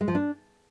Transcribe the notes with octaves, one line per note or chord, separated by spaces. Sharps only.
G#3
F3
D4